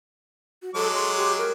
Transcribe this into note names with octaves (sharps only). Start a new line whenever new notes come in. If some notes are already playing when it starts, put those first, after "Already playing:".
F#4
F#3 G#3 A4 D6
C6
G4
A#4